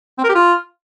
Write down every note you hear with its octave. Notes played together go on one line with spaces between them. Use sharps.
C4
A#4
G4
F4